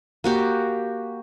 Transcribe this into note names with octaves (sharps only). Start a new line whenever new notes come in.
A#3 F#4 G4